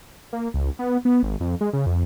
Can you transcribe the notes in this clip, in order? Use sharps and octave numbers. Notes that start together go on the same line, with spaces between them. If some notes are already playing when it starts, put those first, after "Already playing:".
A#3
C#2
B3
B3
G#1
F2
G#3
C#3
F2